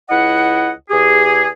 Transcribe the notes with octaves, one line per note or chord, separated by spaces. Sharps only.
C#2 E4 D#5 F#5
E2 G4 G#4